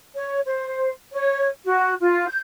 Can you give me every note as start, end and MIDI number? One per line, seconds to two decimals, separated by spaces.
0.14 0.39 73
0.46 0.89 72
1.13 1.46 73
1.64 1.95 66
2.00 2.26 65
2.27 2.41 91